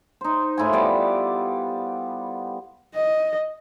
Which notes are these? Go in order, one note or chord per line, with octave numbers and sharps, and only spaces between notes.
D#4 C5
A2 E4 F4 G#5
G3 B3 D5
D#5